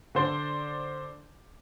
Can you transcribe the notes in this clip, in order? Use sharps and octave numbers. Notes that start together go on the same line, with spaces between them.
D3 D4 C5 D5